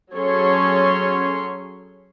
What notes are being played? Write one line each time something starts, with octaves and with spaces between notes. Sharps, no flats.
F#3 C#4 G#4 A4 C#5 C6